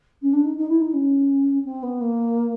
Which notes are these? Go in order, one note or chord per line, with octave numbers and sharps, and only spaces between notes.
C#4
D4
D#4
D#4
E4
D#4
C#4
C4
B3
A#3